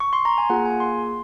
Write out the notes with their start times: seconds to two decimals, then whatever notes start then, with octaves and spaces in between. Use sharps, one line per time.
0.00 C#6
0.13 C6
0.25 A#5
0.38 G#5
0.50 A#3 F4 G#4 F#5
0.66 G#5
0.80 C6